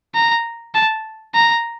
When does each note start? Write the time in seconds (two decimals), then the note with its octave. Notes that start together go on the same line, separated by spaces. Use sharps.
0.15 A#5
0.75 A5
1.35 A#5